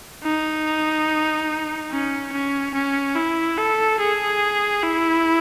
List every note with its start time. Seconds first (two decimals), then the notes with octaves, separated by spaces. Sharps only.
0.24 D#4
1.90 C#4
2.32 C#4
2.74 C#4
3.16 E4
3.58 A4
4.00 G#4
4.83 E4